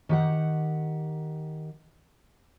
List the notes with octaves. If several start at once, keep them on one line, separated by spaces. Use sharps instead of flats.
D#3 G4 F#5